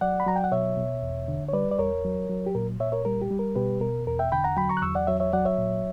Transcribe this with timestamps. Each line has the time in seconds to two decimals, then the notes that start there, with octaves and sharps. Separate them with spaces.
0.01 F#3 D5 F#5
0.20 B5
0.26 F#3 A#5
0.36 G5
0.44 F#5
0.52 B2 C#5 E5
0.77 B2
1.02 E2
1.28 D3
1.49 C#5
1.53 G3 B4 D5
1.71 D5
1.79 E2 A#4 C#5
2.05 F#3
2.29 F#3
2.46 G4
2.55 A#2 A#4
2.80 A#2 C#5 E5
2.92 A#4 C#5
3.05 G3 A#4
3.22 G4
3.31 G3
3.39 A#4
3.56 B2 G4 B4
3.81 B2 A#4
4.07 E2 A#4
4.19 E5 G5
4.32 D3 G5 B5
4.44 F#5 A#5
4.57 F#3 G5 B5
4.69 A#5 C#6
4.77 F#6
4.82 E2 C#6 E6
4.95 D5 F#5
5.07 F#3 C#5 E5
5.20 C#5 E5
5.33 F#3 D5 F#5
5.45 C#5 E5
5.58 A#2